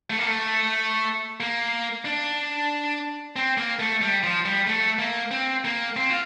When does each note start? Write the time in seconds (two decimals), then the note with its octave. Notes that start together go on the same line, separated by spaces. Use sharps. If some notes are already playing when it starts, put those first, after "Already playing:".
0.10 A3
0.18 A#3
0.27 A3
1.40 A#3
2.05 D4
3.36 C4
3.58 A#3
3.80 A3
4.01 G3
4.23 F3
4.45 G3
4.67 A3
4.99 A#3
5.31 C4
5.65 A#3
5.96 C4
6.10 F4